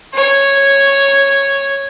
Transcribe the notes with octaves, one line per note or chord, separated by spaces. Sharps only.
C#5